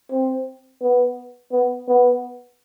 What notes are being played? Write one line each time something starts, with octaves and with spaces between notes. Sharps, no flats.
C4
B3
B3
B3